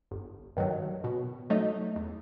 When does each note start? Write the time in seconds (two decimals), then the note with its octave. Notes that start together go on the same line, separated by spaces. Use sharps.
0.11 G1
0.57 G2 D#3 F#3
1.04 B2
1.50 F#3 A3 D#4
1.96 E2